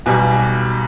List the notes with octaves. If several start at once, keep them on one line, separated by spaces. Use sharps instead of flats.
B1 B2 G3 G#5